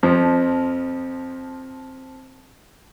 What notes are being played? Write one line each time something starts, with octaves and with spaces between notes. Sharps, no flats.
F2 F3